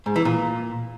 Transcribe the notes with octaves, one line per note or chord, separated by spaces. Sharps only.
G#2
E3
A#2